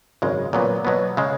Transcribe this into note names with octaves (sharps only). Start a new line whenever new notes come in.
G#1 F#2 C#3 G#3
A#2 F#3 B3
B2 F#3 B3
C#3 G#3